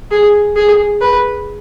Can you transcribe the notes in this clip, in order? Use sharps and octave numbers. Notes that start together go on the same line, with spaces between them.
G#4
G#4
B4